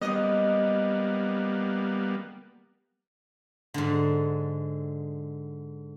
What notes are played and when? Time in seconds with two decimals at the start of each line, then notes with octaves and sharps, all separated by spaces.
0.02 F#2 G3 A#3 B3 D#5
3.74 G#2 D3